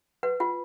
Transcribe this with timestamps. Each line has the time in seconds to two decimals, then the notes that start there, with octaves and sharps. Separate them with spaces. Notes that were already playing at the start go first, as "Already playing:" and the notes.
0.23 B4 F#5
0.40 F4 F#5